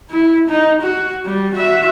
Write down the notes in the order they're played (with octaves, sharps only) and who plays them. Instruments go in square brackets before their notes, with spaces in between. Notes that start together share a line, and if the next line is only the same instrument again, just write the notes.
[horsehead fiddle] E4
D#4
F#4
G3
F#4 E5